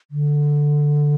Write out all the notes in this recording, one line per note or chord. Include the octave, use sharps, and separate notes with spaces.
D3